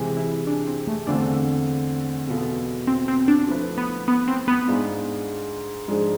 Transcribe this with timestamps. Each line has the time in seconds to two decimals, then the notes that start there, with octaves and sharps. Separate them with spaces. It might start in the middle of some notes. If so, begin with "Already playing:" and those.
Already playing: C3 E3 G#3
0.17 E4
0.47 D4
0.67 C4
0.87 A3
1.07 E2 D3 A3 C4 D4 F4
2.27 E2 B2 B3 F4 A4
2.87 C4
3.08 C4
3.28 D4
3.48 F3 A3 E4 B4
3.78 B3
4.08 B3
4.28 C4
4.48 B3
4.68 G#2 G#3 D4 F4
5.88 G#2 F3 G#3 D4 G#4